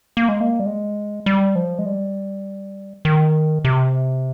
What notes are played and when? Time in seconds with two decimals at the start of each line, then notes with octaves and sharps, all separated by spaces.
0.17 A#3
0.29 G#3
0.41 A#3
0.60 G3
0.66 G#3
1.26 G3
1.55 F3
1.79 G#3
1.86 G3
3.05 D#3
3.65 C3